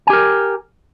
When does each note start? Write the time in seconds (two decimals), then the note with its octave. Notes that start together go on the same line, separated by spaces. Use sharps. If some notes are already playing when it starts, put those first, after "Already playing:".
0.07 G#5
0.10 G4
0.13 A#4